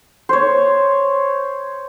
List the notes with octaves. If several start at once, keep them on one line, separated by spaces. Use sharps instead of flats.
C5 C#5